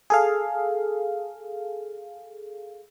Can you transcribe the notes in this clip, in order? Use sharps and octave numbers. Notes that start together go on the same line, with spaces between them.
G#4 A4 F5